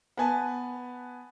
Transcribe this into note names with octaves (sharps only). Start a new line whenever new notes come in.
B3 B4 G#5 A5